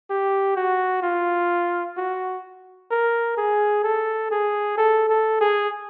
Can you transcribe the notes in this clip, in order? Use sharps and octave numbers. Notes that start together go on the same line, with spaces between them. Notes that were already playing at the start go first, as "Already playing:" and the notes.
G4
F#4
F4
F#4
A#4
G#4
A4
G#4
A4
A4
G#4